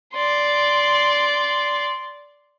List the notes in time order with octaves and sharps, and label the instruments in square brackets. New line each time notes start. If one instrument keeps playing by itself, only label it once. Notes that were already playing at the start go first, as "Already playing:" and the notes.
[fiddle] D5 C6